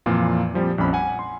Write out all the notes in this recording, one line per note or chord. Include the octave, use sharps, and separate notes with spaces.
F2 A#2 E3 F3 A#3 F4
A#2 F3 G3 C4
A#1 F2 C#4 B5
F#5 G#5
C6